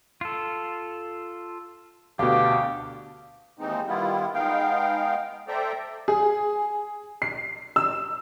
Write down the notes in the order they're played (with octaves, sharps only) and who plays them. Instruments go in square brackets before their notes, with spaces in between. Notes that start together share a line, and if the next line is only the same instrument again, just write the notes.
[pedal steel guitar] F4 A4
[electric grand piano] D2 B2 [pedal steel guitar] D4 [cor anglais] G4 [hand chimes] F5
[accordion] D#2 E3 G#3 C4 D#4
D#3 G3 B3 E4 F4
G#3 B3 D#4 F5 G5
A4 C5 D5 E5 G5 A#5
[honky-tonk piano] G#4
C7
E6